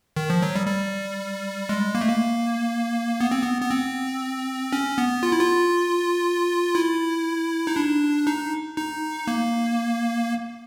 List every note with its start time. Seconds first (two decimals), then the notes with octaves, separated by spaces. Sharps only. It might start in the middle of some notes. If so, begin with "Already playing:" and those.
0.17 D#3
0.30 F3
0.42 F#3
0.56 G3
0.67 G3
1.69 G#3
1.95 A#3
2.01 A3
2.09 A#3
3.21 B3
3.31 C4
3.43 B3
3.62 B3
3.71 C4
4.73 C#4
4.98 B3
5.23 F4
5.32 E4
5.40 F4
6.75 E4
7.67 D#4
7.76 D4
8.27 D#4
8.77 D#4
9.27 A#3